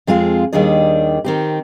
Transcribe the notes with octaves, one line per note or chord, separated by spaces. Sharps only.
F2 G#3 C4 F4 G#4
D#2 D#3 G3 D4 G#4 D5
D#3 C4 G4